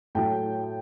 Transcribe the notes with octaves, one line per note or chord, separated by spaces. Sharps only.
A2 F#3 G5 A5